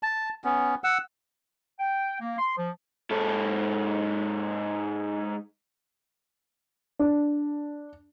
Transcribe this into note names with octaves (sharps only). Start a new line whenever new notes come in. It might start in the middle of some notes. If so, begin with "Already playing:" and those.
A5
B3 C#4
F#5 E6
G5
A#3
C6
F3
G#2 A4
D4